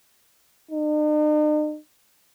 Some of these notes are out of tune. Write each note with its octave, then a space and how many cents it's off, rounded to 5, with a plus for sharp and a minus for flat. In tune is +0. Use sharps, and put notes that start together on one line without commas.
D#4 -45